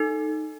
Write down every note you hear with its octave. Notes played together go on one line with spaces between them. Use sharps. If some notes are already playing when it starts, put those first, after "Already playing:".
Already playing: D#4 A4